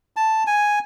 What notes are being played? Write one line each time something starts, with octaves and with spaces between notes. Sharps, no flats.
A5
G#5